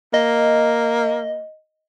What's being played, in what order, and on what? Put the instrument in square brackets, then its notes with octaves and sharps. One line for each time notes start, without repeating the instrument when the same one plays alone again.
[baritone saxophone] A#3 [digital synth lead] D#5